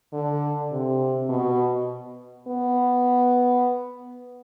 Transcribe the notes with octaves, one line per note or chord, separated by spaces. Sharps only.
D3
C3
B2
B3